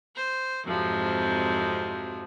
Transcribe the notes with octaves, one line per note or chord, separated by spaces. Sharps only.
C5
F2 G#2 C3 F3 F#3